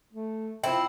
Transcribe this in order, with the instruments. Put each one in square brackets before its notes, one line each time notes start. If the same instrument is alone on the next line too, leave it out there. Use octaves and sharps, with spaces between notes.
[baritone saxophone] A3
[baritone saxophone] F3 [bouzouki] C4 E4 [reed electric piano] G5